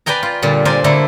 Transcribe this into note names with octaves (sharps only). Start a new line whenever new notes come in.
B4 D5 G5 G#5 A#5
F4
A#2 D3 G3
A#4 C5 D5 G#5
D3 A3 A#3 E4